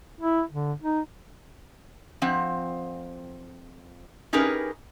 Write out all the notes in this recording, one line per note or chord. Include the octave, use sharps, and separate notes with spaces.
E4
D3
D#4
F2 F3 C4 F#5
C#4 D#4 G4 G#4 A#4 B4